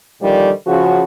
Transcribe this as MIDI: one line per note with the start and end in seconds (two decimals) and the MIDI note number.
0.22 0.50 46
0.22 0.50 50
0.22 0.50 51
0.22 0.50 53
0.22 0.50 55
0.67 1.03 49
0.67 1.03 53
0.67 1.03 66